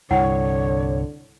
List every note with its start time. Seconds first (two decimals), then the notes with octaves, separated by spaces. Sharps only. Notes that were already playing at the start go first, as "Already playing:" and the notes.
0.11 C2 G2 D3 E4 C#5 F#5 G5